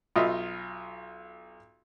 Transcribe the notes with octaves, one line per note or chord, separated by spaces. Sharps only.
B1 F4 D#5 E5